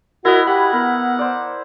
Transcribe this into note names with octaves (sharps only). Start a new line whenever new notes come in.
E4 F#4 A#4 B4 D#5
G4 F#5 B5
B3 A#4
C5 D5